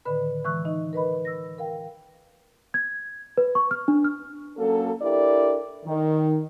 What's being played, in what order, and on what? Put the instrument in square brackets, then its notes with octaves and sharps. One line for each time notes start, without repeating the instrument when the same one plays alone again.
[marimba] A2 D3 D#3 B4 B5
E3 G#3 C#6 E6 F#6
D#4 D#5
A#4 B4 D#5 B5
E6 A#6
A#4 F5 G5
[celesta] G#6
B4
C#6
F6
D4
F6
[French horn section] F#3 A#3 C#4 F#4 A4
D4 E4 G4 A4 A#4 D5
D#3